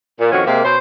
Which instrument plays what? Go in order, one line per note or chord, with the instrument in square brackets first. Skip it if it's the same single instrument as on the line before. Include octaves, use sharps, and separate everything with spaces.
[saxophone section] A#2
F2 D#3 C#4 F#4
C3 G#3 A#3
B2 C#4 C5